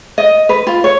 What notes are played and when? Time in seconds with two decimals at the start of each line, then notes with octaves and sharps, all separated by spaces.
0.18 D#5
0.49 B4
0.67 F4
0.84 C#5